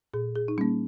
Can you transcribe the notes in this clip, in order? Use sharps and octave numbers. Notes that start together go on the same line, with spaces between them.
A#2 G#4
G#4
D#4
G3 A#3 C#4